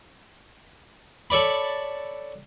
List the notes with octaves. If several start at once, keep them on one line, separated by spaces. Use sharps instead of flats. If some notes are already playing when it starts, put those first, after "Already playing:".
A4 C#5 D5 B5